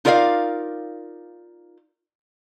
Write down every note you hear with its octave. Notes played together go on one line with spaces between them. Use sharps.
D#4 F4 A#4 D5 D#5 F5